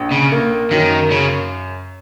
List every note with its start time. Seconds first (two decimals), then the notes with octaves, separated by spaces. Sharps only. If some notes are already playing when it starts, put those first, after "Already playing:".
Already playing: A#1
0.12 C#3
0.32 A#3
0.71 F#2 D#3
1.11 C#3